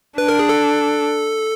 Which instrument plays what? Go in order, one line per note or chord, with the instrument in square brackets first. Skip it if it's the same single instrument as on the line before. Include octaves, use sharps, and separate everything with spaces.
[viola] D4 [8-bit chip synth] B4
[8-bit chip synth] A#4
G#4
A4